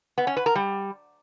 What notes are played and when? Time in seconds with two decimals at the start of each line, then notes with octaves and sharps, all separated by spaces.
0.18 B3
0.27 C#4
0.36 B4
0.46 A#4
0.55 G3